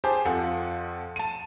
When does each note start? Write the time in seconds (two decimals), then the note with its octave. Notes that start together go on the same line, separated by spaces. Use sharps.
0.04 G4 G#4 C5 G#5 A5
0.25 F2 F3 A4 F#5
1.16 A5 D#7